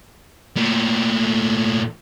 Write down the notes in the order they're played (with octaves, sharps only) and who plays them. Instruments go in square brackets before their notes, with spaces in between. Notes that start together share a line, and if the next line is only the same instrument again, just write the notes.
[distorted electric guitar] A#2 A3